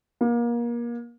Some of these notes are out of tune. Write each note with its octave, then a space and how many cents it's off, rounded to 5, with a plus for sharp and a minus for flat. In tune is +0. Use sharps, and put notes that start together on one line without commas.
A#3 +30